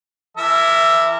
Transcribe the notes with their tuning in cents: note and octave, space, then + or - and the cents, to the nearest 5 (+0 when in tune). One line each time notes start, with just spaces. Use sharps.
E3 +30 A#4 -25 E5 +10